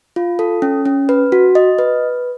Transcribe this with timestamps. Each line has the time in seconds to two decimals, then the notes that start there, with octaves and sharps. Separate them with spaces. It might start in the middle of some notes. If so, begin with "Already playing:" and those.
0.16 F4
0.39 A4
0.62 C#4
0.85 C#4
1.09 B4
1.32 F#4
1.55 D#5
1.79 B4